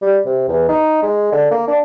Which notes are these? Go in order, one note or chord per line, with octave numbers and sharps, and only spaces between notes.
G3
C3
E2
D#4
G#3
D3
A#3
D4